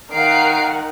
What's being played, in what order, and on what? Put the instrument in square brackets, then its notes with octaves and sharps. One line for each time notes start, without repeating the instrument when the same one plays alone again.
[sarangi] D#3 [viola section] A#4 F#5 [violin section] F5 C7 D7